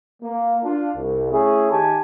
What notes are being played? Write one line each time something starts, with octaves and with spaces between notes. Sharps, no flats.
A#3
D4 F4
C2
A3 C#4 E4 G#4
D#3 G4 G#5 A5